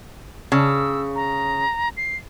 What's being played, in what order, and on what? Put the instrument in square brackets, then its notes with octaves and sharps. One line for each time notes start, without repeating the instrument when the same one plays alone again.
[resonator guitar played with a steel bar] C#3 [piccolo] E6
[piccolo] A#5
C7